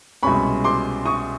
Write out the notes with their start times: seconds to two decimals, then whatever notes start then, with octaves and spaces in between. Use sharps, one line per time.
0.23 C2 B2 G#3 C#4 B5 C#6
0.64 C6 D6
1.05 C#6 D#6